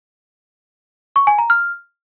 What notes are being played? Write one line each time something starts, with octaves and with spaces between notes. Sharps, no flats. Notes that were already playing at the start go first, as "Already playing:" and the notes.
C#6
G#5
A#5
F6